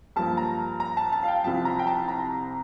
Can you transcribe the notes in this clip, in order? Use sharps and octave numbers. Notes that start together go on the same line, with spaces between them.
G2 F3 A#3 A5
A#5
A#5
A5
A5
F5
G5
C2 C3 F3 A5
A#5
G5
A5
A#5